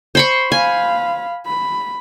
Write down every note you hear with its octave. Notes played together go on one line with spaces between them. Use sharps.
C5 B5 C#6
F5 G#5 B5
B5